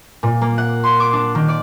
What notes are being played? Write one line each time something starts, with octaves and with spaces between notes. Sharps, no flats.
A#2
A#3
F#5
C6
D6
D4
D#3
D5